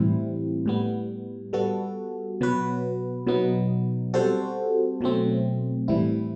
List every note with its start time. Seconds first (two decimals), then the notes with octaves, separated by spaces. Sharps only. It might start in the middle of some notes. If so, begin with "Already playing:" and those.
Already playing: A2 E3 G3 C4 E4
0.66 A2 G3 B3
1.53 G3 B3 F#4 A4
2.41 B2 F#3 B3 F#4 B4
3.27 B2 F#3 B3 D#4
4.14 G3 C4 F#4 A4 C5
5.01 B2 F#3 A3 C4
5.88 A2 E3 G3 C4 E4